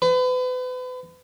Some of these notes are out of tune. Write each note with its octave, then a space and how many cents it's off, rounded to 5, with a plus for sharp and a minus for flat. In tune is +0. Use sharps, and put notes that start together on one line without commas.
B4 +35